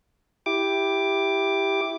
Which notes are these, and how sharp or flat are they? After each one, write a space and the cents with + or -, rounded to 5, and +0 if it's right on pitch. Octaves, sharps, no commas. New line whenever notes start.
E4 +0 G4 +0 D6 +5